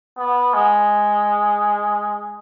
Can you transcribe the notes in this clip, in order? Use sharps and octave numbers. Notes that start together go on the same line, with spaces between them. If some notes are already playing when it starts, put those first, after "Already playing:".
B3
G#3